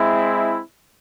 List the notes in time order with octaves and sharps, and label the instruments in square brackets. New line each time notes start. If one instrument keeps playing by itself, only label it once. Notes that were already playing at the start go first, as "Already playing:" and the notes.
Already playing: [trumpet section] G#3 C4 E4